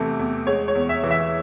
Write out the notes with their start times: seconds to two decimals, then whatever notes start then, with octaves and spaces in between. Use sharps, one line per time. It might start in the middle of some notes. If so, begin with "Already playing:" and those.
Already playing: E2 C3 E3 A3
0.19 E2
0.47 G#3 C#5
0.68 C#5
0.75 E2
0.89 E5
1.03 E3
1.11 E5